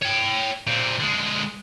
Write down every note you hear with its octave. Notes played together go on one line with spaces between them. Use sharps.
C#5 G5
A#2 C4
D3 G#3